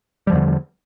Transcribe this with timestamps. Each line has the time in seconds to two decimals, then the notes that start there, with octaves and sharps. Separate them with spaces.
0.27 G3
0.30 F3
0.32 E2
0.35 D3